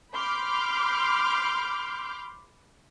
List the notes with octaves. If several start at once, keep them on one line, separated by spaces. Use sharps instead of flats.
B5 C6 D6 F6 G6